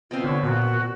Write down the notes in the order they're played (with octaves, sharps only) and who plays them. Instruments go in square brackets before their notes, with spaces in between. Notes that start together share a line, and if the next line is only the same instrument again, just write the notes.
[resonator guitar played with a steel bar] B2 B3 C4 [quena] F4
[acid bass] D3 [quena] C#5
[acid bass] A#2 [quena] F#4